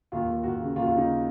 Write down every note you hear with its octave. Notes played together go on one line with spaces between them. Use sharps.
D#2 F4
D#2
D#2 F#4
C#3
D#2 F4
C#3 F4
D#4